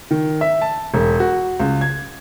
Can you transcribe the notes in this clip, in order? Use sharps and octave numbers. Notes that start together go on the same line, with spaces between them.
D#3
E5
A5
E1
F#4
C#2
G#6